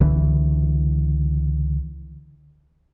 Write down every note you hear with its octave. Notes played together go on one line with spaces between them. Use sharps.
C#2 D3 E3